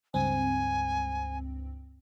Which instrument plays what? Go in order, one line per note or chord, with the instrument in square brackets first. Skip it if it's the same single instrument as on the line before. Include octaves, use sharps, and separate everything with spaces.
[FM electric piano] C#2 G2 C4 [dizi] G#5